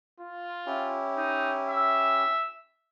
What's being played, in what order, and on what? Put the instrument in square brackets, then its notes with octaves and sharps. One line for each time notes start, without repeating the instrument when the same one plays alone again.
[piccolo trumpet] F4
[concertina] C#4 E4 G4
[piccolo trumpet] D#4
E5